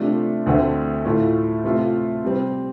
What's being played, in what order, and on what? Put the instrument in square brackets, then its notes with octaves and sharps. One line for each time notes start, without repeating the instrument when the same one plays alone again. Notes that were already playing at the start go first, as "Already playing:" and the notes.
Already playing: [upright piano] C3 A3 D4 F4
D2 D3 A3 C4
A2 A3 F4
C3 A3 F4
C3 G3 C4